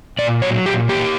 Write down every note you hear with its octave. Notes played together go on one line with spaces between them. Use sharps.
A#2 D5
F#3 C#5
A#2 G4
A#3 G4